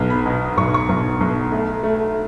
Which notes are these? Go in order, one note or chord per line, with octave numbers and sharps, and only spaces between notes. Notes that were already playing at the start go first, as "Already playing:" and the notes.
Already playing: B1 B3
B5
B2
B1 C#6
C#6
B1
B1
A3
A3